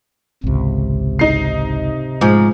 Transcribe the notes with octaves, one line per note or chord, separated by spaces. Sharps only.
G#1 C#2 C3
D#4 C7
G#2 F3